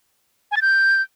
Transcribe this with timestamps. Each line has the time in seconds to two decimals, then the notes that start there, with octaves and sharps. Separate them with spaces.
0.51 G#5
0.56 A6
0.62 G6